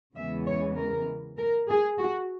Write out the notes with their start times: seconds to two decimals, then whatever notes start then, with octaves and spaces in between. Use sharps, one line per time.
0.16 E2 C#3 E3 G#3 B3 E5
0.46 C#5
0.76 A#4
1.37 A#4
1.69 G#4
1.99 F#4